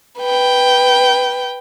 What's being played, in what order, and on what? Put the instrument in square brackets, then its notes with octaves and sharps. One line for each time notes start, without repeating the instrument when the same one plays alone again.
[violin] B4 G5